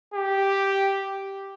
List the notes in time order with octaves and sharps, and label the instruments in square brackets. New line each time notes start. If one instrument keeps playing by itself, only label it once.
[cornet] G4